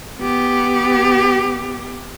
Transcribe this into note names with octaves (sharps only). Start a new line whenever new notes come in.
B3 G4